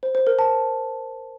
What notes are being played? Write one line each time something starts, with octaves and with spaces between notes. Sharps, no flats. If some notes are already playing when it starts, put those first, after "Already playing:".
C5
C5
A#4
A5